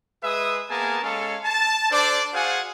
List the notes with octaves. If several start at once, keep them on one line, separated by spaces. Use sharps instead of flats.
G#3 G#4 B4 E5 D#6
A#3 B3 G#4 A#4 G#5 A5
G#3 C#4 G#4 A4 C#5 F5
A5
D4 A4 C5 D5
F#4 G#4 C5 F5 F#5 G#5